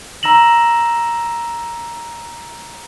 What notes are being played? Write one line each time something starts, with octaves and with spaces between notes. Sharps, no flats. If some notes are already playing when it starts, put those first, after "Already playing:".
A#5 E6 A#6 E7 F#7